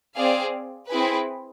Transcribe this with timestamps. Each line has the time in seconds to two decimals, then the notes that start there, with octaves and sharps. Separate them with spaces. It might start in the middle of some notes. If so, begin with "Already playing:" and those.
0.15 C4 G#4 D5 F5
0.89 C4 E4 G#4 B4